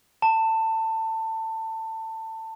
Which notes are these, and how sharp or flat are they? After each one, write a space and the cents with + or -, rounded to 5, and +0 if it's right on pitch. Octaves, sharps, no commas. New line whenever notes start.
A5 +20